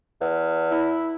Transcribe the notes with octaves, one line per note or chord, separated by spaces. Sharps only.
E2
E4